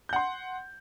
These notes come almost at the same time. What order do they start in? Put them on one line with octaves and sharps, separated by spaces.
G6 F#5 C6